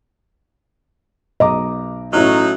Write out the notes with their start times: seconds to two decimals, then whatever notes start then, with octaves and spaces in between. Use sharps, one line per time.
1.40 B1 D#5 A#5 D6
2.13 A1 A2 F#3 A3 D#4 F6